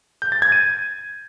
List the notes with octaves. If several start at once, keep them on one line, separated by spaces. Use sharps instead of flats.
G6
A6
G#6
D#7